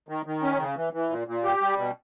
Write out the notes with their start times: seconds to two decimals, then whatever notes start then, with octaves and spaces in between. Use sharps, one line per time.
0.09 D#3
0.26 D#3
0.43 C#4
0.60 C#3
0.76 E3
0.93 E3
1.10 A#2
1.27 A#2
1.44 G4
1.61 G3
1.78 B2